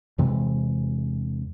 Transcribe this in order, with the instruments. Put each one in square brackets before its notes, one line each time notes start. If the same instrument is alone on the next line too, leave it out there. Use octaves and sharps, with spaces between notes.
[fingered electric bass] E2 C3 E3 G#3